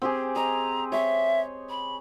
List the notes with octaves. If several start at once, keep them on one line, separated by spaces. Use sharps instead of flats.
C4 G4 G#4
D#5 A#5
C#5 E5 C6
B5